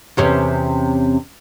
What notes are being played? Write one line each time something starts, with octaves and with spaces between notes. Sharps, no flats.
E2 C3 C#4